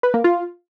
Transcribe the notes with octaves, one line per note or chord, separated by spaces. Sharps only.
B4
A#3
F4